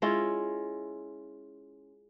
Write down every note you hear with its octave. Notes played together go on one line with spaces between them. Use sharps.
G#3 C#4 E4 F4